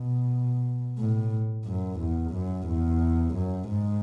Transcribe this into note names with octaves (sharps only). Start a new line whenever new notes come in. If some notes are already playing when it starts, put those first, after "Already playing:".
Already playing: B2
A2
F#2
E2
F#2
E2
F#2
G#2